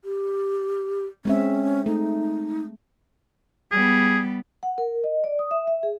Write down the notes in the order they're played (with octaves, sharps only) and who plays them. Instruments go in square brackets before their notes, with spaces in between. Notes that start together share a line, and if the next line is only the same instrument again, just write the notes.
[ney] G4
[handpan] G#3 C4 E5 [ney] C#4
[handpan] A3 [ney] D#4
[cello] G3 B3 [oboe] G#4
[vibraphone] F#5
A#4
D#5
D5
D#6
E5
E5
G#4